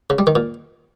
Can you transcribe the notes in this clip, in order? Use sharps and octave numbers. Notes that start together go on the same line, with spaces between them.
C#3
G3
D#3
A#2